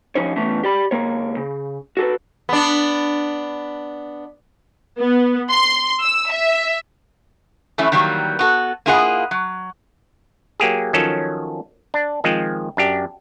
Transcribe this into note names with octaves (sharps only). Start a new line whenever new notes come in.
D#2 F3 C#4 D#4 C#5
E3 A3 B3 C#4
G4 D5 B5
C#2 A#3 C#5
C#3
F#4 A4 B4
B3 D4
B3
C6
E6
E5
E3 F#3 A3 C#4 E4
D#3 E3 F#3 G3 A#3
B3 F#4 A4
A#3 E4 F4 G#4 A4 F#5
F#3
F#3 A#3 G4 G#4
D#3 F3 F#3 C#4 A4
D4
D#3 F3 G#3 C4
F#2 D4 G4